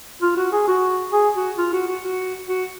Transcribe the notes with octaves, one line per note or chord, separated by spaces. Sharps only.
F4
F#4
G#4
F#4
G#4
F#4
F4
F#4
F#4
F#4
F#4